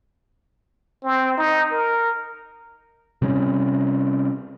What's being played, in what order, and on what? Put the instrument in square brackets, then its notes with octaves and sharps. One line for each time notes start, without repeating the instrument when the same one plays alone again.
[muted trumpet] C4
D#4
A#4
[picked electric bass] C3 G3 C#4